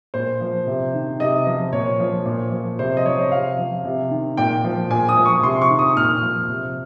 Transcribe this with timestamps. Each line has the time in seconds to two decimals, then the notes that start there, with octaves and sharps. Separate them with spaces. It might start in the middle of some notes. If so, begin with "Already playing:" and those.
0.14 A#2 C5
0.41 F3
0.67 C3
0.94 D#3
1.20 C3 D#5
1.47 F3
1.72 A#2 C#5
2.00 F3
2.26 A#2
2.52 F3
2.79 C3 C5
2.97 D#5
3.05 F3 C#5
3.32 C3 F5
3.59 F3
3.85 C3
4.11 D#3
4.37 A#2 G5
4.64 F3
4.90 A#2 G#5
5.09 D#6
5.17 F3
5.26 C#6
5.43 C3 C6
5.62 C#6
5.70 D#3
5.79 D#6
5.97 A#2 F6
6.23 F3
6.49 C3